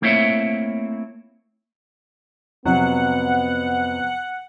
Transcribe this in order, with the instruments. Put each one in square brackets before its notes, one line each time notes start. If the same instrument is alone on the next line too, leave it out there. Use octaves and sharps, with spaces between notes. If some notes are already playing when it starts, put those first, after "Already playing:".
[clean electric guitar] A3 A#3 C4 E4 C#5 E5
[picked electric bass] F2 [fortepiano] C3 F#3 [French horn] B3 [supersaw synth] F#5